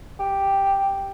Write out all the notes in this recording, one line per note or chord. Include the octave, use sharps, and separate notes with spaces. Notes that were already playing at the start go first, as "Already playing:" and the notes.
G4